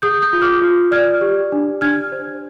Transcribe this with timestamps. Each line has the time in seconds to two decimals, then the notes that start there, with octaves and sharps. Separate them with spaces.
0.02 G#4 D#6 G6
0.22 D#6 G6
0.33 F4
0.41 D6 F6
0.61 F4
0.91 D5 F6 G#6
1.21 G4
1.52 D4
1.81 D4 F6 G#6
2.12 C5